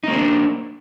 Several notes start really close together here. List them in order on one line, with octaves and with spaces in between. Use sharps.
D#4 A#3 C4 D4